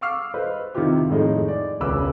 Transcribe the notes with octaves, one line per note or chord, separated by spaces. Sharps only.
F5 C#6 D6 E6 F6 C7
B4 C5 D#5
C3 D#3 E4 F4 G4
F2 A2 D#3 G#3 D#4
D5
E1 C#2 C#3 B4 D6 E6